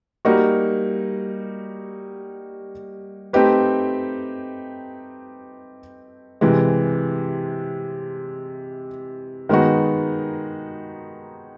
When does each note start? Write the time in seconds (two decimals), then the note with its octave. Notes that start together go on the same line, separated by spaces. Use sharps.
0.25 G3 A#3 D#4 F#4
3.33 A3 C4 D#4 G4 B4
6.41 C3 E3 G#3
9.49 D#3 G#3 B3 D#4 F#4